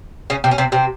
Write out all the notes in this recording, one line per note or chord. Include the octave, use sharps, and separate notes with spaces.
C#3 C#4
C3 C4
C#4
C3 C4
C3 C4